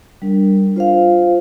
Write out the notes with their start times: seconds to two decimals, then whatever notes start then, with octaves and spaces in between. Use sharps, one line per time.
0.22 G3 D4 A#4
0.76 F4 C5 F5